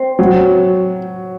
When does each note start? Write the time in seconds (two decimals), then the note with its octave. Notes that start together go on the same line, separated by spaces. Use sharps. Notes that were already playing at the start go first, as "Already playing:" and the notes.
Already playing: C4
0.19 F#3